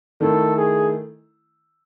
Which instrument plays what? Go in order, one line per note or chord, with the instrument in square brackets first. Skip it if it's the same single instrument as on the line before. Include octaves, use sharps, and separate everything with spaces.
[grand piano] D#3 A3 E4 [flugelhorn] A4
[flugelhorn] G#4